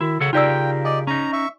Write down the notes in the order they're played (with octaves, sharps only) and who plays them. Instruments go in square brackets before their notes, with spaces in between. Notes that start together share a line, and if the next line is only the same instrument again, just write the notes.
[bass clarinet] D#3 [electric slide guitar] E4 [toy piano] F#4
[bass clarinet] C#3 [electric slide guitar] A4 C#5 F#5
[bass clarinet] C#3 [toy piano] D#4 D5 E6 [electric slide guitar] F4 G4 A#4 [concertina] G5
[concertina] D5 D#5 [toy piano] G#5
[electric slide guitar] C#4 D#4 [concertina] A#5
[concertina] E5 C#6